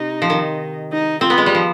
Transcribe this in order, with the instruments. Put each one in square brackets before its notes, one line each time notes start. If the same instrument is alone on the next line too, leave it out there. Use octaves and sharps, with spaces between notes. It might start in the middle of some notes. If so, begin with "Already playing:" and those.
Already playing: [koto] C3 [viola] D#4
[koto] F3
D#3
[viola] D#4
[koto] C4 [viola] F4
[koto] B3
G#3
G3
F3